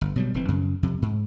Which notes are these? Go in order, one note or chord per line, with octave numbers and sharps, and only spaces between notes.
G1
B2 F#3 G3
F1 E3 C4
F#2 C#3
F2 C3
G#2